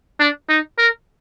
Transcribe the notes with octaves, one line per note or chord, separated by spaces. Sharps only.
D4
D#4
A#4